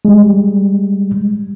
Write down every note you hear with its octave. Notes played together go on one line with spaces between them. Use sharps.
G3 G#3